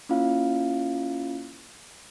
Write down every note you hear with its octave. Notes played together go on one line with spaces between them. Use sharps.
A#3 C#4 E4 F4 F5